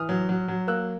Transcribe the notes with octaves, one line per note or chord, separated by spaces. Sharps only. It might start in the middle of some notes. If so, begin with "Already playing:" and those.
Already playing: E3 D#6 F6
F#3
F#3
F#3
A#3 E6 F#6